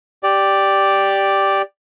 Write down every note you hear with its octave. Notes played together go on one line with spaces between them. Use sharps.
G4 D5